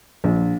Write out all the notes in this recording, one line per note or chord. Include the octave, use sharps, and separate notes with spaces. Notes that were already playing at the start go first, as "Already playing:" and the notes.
A#1